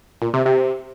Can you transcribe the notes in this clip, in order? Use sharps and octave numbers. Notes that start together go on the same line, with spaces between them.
A#2
C3
C3